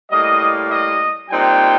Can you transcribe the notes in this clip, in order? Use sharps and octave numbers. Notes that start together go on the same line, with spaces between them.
A2 G3 A#3 D#5
D#5
A#2 G3 C4 D#4 G5